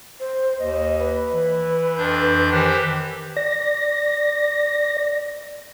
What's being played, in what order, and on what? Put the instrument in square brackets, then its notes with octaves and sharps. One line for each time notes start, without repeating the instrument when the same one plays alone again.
[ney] C5
[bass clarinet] D#2 [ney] D#5
[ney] B4
[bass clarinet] E3
[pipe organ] F2 D4 G6
[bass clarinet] D#3 [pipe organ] E3 G4 C5
[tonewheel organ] D5 A#6